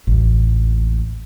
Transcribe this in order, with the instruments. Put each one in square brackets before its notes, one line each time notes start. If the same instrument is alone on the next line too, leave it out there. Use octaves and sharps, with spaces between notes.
[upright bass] A1 D#2